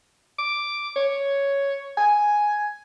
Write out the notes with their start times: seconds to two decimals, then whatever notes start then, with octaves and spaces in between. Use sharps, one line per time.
0.39 D6
0.96 C#5
1.98 G#5